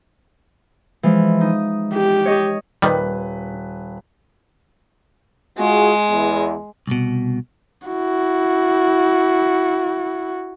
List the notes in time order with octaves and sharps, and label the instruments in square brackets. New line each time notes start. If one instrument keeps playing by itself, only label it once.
[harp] E3 F3 G#3
D#4 D#6
[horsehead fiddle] G4
[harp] C#5 D#5
[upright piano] D#1 B4 [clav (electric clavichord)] D#3 G3
[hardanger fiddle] G#3 [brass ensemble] F4 F#4 G#4
[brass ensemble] E2
[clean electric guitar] C2 B2
[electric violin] E4 F#4